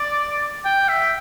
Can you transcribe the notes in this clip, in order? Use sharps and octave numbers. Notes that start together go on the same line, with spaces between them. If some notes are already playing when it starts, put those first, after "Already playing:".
Already playing: D5
G5
E5